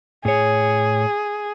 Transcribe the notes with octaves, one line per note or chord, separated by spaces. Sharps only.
A2 G#4 C#5